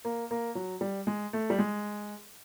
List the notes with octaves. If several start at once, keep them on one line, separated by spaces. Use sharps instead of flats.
A#3
A#3
F#3
G3
G#3
A3
G3
G#3